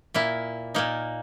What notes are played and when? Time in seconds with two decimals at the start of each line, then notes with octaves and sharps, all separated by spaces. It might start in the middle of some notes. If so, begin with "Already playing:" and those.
0.14 A#2 A#3 E4
0.75 A#2 A#3 D#4